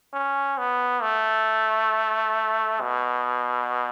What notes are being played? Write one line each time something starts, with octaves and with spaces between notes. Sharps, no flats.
C#4
B3
A3
B2